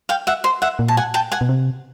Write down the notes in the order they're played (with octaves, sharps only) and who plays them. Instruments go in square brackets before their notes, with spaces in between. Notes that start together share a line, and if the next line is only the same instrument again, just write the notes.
[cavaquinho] F5 G5
E5 F#5
C5
E5 F#5
[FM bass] A#2
[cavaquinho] A5
F#5 G#5
G5 A5
F#5 G#5
[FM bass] B2
C3